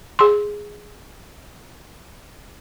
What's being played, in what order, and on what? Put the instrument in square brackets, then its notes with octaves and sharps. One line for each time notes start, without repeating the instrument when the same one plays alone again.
[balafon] G#4 C6